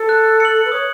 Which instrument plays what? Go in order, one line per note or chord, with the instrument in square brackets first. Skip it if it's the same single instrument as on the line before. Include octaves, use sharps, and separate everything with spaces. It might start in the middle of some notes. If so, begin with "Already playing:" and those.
Already playing: [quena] A4
[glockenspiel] F#6
C#7 F#7
[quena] B4
[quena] C#5 [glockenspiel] D#6